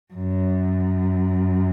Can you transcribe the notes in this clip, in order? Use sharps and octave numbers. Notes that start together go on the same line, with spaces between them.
F#2